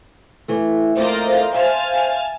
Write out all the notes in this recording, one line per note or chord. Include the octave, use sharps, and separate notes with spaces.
E3 A3
F2 A3 A#3 C5 D5 D#5 F5 A#5
E5 G#5 A5 F6